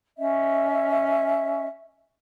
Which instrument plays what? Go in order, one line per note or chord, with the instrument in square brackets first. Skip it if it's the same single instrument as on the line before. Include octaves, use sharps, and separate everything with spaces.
[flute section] C#4 D#5 E5